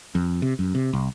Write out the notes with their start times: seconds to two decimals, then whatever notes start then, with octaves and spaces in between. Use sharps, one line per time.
0.15 F2
0.42 C3
0.59 F#2
0.75 C3
0.93 C2